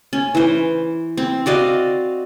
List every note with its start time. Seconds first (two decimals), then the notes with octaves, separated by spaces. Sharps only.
0.13 C#4
0.35 E3 C5
1.17 C4
1.46 F#4 D5 D#5 F5